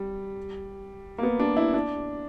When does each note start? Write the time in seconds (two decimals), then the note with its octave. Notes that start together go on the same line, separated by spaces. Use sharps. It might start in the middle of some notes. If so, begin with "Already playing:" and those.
Already playing: G3
1.18 A#3
1.23 B3
1.40 D4
1.57 E4
1.74 D4